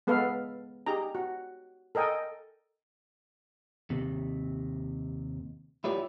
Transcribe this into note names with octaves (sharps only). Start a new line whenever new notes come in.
G#3 B3 A4 B4 F5
D#4 G4 G#4 A#5
F#4
A4 A#4 D#5 G5 G#5
D#2 C3
E4 F4 G4 C#5 D5